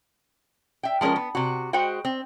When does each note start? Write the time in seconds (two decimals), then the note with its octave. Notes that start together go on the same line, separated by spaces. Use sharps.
0.83 E5 G5
1.01 F3 G#3 C4 C#4 A#4
1.16 B3
1.35 C3 F#4
1.73 G#3 F#4 C5 F#5 G5
2.05 C4